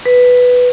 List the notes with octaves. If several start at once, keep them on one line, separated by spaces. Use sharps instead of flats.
B4